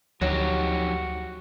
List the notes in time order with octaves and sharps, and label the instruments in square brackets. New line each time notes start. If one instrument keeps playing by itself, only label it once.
[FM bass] D2 [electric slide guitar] F3 D#4 G4 [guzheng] F#3 [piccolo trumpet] F#4